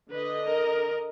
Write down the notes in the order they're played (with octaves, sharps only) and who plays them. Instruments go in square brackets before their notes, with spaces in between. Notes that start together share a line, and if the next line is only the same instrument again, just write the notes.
[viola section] D3 D#5 [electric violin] B4
[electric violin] A#4